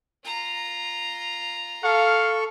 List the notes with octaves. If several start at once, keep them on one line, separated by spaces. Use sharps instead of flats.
F4 A#5
A4 F5 C#6